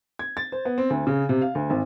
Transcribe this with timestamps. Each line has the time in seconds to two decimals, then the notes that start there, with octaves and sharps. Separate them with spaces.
0.19 G#6
0.37 A6
0.52 C5
0.65 B3
0.78 C4
0.90 D2
1.07 C#3
1.29 C3
1.42 F5
1.55 D2
1.70 G#1